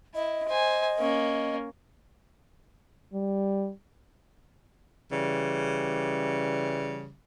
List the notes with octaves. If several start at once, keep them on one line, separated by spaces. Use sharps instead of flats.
E4 D#5
C5 G#5
A#3 C#4
G3
C#3 E3 G3